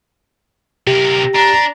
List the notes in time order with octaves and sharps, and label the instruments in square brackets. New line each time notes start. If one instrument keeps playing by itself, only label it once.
[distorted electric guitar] C3 A#4 [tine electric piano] G4
[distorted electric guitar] D4 [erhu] A#5